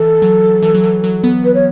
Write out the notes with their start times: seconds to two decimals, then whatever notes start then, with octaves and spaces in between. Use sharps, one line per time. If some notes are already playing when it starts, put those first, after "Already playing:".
Already playing: E3 A4
0.22 F#3
0.62 E3
0.75 F#3
0.84 E3
1.04 F#3
1.24 B3
1.44 B4
1.54 C#5